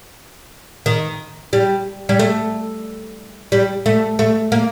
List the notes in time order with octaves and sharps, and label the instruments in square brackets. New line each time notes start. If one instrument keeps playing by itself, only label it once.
[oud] D#3
G3
G3
A3
G3
A3
A3
A#3